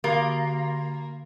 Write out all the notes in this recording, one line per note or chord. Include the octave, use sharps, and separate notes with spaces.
D3 A#3 F#4 C6